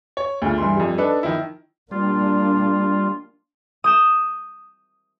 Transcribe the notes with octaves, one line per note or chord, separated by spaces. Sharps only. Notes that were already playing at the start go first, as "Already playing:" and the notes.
C#5
D2 C#3 F4
G2 E3 C6
F2 G3
D4 D#4 A4 B4
D#3 F3 E4
G3 A#3 D4 F4
D#6 G6 E7